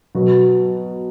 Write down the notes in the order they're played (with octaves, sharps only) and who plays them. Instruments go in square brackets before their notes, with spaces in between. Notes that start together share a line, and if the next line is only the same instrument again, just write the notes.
[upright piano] B2 F#3 B3 F#4